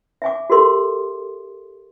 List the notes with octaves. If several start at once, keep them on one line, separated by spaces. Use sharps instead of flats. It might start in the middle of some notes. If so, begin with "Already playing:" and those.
E5 G#5 D6
F#4 G4 A4 A#4 C6 D6